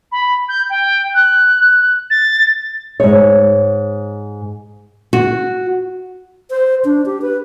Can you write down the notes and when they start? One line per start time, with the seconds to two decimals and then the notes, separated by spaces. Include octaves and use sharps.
0.11 B5
0.48 G6
0.69 G5
1.14 F#6
2.10 A6
3.00 G#2 C#5
5.13 F#4
6.50 C5
6.85 D4
7.06 G4
7.22 B4